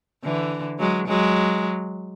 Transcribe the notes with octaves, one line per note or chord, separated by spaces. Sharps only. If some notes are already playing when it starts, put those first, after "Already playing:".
D3 E3
F#3 G#3
F#3 G#3